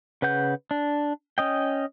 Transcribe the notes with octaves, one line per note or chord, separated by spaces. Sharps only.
C#3 B4 F#5 G6
D4
C#4 D#5 G5